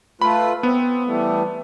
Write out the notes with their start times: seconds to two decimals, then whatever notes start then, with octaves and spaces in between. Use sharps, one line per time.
0.22 A3 F4 B4 B5
0.63 B3 C4
1.06 E3 G3 A3